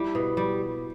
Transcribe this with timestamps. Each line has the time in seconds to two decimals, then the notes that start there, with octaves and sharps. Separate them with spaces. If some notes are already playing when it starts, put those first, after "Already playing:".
Already playing: G3 E4
0.15 B2
0.37 G3